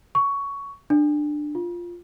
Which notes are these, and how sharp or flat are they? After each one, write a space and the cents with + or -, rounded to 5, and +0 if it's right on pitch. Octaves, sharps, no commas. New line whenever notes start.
C#6 +15
D4 +20
F4 -5